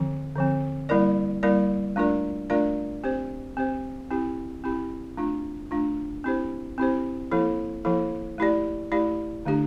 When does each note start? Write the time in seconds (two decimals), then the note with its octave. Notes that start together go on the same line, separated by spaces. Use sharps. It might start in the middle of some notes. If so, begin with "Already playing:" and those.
Already playing: D3 F3 C4
0.36 D3 F3 C4
0.89 G3 A#3 E4 A#4 D5
1.43 G3 A#3 E4 A#4 D5
1.96 A3 D4 F4 A#4 D5
2.50 A3 D4 F4 A#4 D5
3.04 C4 G4 C5
3.57 C4 G4 C5
4.11 C4 E4 G4
4.64 C4 E4 G4
5.17 A3 D4 F4
5.71 A3 D4 F4
6.24 C4 E4 G4 C5
6.78 C4 E4 G4 C5
7.31 F3 A#3 E4 A4
7.85 F3 A#3 E4 A4
8.38 A3 E4 G4 D5
8.92 A3 E4 G4 D5
9.45 D3 A3 D4 G4